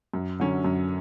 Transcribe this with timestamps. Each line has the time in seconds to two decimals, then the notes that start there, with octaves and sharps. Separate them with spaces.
0.14 F#2
0.40 D3 F#3 C#4
0.64 F#2